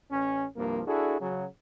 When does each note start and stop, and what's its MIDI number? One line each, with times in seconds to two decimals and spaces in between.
0.11 0.45 33
0.11 0.45 61
0.56 0.82 36
0.56 0.82 43
0.56 0.82 53
0.56 0.82 58
0.86 1.15 62
0.86 1.15 64
0.86 1.15 66
0.86 1.15 68
0.86 1.15 69
1.20 1.44 49
1.20 1.44 54